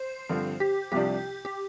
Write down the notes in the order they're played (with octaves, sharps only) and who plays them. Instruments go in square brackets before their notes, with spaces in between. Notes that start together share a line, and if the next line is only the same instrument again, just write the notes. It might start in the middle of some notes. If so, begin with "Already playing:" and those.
Already playing: [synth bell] C5
[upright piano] G2 D3 F3 C4
[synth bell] G4
[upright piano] C2 C3 F3 D4 [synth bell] G4
[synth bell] G4